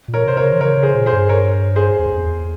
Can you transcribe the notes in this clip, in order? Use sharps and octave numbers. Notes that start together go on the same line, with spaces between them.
A#2
A#4 C#5
C3 C5
A#4 C#5
C#3
E3
C#3 A#4 C#5
C#3
G#4 C5
A#2
G#4 C5
G2
A#4 C#5
G#4 C5
E2
F2
E2